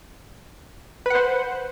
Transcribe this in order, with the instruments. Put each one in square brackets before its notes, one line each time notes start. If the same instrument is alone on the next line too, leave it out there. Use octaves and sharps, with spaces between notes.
[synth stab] B4
F#5
C5